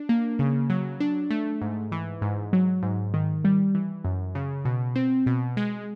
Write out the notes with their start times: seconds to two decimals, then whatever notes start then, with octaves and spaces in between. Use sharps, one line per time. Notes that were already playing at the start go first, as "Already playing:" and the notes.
Already playing: D4
0.09 A#3
0.39 C#3
0.70 F#3
1.00 D4
1.30 A3
1.61 G#2
1.92 E3
2.22 G#2
2.53 F#3
2.83 G#2
3.14 D#3
3.45 G3
3.75 E3
4.04 F#2
4.35 C#3
4.65 B2
4.96 C4
5.26 B2
5.57 G#3